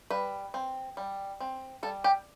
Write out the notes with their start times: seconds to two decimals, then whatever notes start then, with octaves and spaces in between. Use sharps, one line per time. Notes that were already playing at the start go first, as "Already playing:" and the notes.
0.11 G3 B4
0.54 C4
0.97 G3
1.40 C4
1.83 G3 A4
2.04 G4